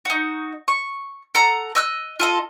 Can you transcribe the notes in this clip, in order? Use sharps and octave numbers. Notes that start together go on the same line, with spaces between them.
D#4 F#4
C#6
A4 F#5 A#5
D#5 E6 F#6
F4 A4 D#5